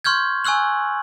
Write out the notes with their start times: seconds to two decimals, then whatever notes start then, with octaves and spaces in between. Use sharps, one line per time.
0.04 C6 C#6 F6 G6 G#6
0.45 G#5 C#6 E6 F#6 F#7